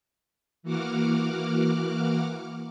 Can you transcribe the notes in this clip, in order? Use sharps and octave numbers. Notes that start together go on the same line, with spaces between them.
E3 A#3 F#4 F#5 D6 F6